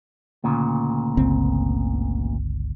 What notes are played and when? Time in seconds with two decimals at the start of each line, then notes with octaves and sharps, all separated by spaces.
0.44 D2 A#2 C#3
1.17 G1 C#2 C4